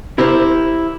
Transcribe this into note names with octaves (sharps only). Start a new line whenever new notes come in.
E4 G4 A#4 C5